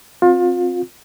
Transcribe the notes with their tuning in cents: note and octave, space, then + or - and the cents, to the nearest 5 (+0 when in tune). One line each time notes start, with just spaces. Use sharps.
C4 +10 F4 +30